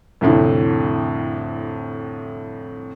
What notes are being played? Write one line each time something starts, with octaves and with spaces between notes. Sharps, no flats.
C2 F2 A2 D3